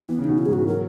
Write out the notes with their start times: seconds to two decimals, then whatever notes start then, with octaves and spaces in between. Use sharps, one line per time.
0.09 E3 B3
0.19 C#3
0.24 B2 D#4
0.38 E4
0.46 G#4
0.48 G#2
0.53 E3 F#4
0.67 F#3 A#4